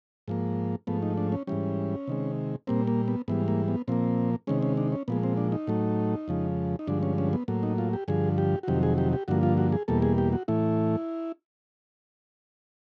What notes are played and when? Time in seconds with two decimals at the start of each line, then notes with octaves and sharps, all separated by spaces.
0.28 G#2 F3 A#3
0.87 G#2 F3 A3 B3
1.02 D#4
1.17 D4
1.32 C#4
1.47 G#2 E3 G3 C#4
2.08 C3 D#3 G#3
2.67 A#2 G3 A#3 C4
2.87 A#3
3.08 B3
3.28 G#2 E3 G3 B3
3.48 A#3
3.68 B3
3.88 A#2 F3 A#3 C4
4.47 C3 D#3 G#3 C#4
4.62 C#4
4.77 D4
4.92 C#4
5.08 A#2 F3 G#3 B3
5.23 C4
5.37 D4
5.52 D#4
5.67 A2 F#3 A3
6.28 F2 C#3 F3 G#3
6.79 D#4
6.87 G2 D3 F3 G#3 D4
7.03 C#4
7.18 C#4
7.33 B3
7.48 A2 F#3 A#3
7.63 D#4
7.78 F4
7.93 G4
8.08 G2 D3 F3 G#4
8.38 G4
8.63 F#4
8.68 F2 C3 D#3 F#3 G4
8.83 G#4
8.98 G4
9.13 G4
9.28 G2 D3 F3 A#3 F#4
9.43 F4
9.58 F#4
9.72 G#4
9.88 E2 B2 G3 A#3 A4
10.02 G#4
10.18 G4
10.33 F#4
10.48 A2 E3 A3 E4